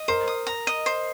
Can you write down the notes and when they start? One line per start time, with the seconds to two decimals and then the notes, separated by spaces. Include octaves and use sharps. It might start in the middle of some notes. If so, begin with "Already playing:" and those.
Already playing: D#5
0.08 A#4 C5
0.28 D#6
0.47 A#5
0.67 D#5
0.86 C5